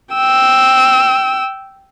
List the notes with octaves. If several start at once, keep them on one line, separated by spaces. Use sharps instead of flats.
G5 E6